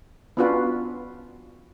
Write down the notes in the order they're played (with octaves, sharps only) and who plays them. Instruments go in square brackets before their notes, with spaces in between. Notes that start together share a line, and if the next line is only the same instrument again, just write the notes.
[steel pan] B3 C#4 D4 F4 F#4 B4